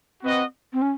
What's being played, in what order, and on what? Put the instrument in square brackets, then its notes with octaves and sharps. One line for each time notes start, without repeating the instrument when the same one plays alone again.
[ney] C4 [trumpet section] F#4 B4 D#5 F#5
[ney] C4
C#4